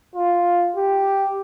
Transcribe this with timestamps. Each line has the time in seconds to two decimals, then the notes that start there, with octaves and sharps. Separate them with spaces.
0.15 F4
0.75 G4